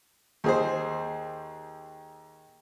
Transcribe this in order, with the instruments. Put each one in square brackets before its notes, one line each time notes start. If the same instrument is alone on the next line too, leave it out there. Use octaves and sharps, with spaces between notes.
[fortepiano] D#2 G#4 C5